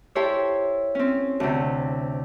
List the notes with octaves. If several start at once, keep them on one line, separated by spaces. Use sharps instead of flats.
E4 G4 A4 C5 C#5
C4 C#4
D2 C3